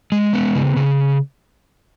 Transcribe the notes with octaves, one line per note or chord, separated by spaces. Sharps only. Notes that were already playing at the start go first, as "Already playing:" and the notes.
G#3
B3
C#3
C#3